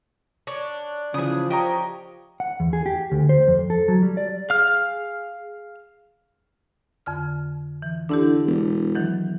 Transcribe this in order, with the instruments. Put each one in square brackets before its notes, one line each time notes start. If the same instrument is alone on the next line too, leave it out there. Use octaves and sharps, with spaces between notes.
[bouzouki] D4 [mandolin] C#5
[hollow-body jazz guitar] C#3 E3 [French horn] F3 [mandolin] G#4 D#6
[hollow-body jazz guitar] G4 [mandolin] A#4 C#5 D#5
[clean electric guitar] F#5
E2
G#4
G4
D2
C5
F2
A4
F#3
G3
D5
[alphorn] G#4 [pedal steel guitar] F5 F6
[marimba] F2 D3 F6
E3
[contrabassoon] D3 [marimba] D4 E4 G4
[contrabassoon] E1
[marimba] D#3 E3 F#3